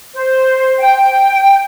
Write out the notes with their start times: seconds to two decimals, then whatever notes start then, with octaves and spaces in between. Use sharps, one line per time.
0.14 C5
0.80 G5